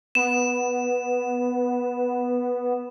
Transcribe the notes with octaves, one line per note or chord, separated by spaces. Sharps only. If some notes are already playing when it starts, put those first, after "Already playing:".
B3 E7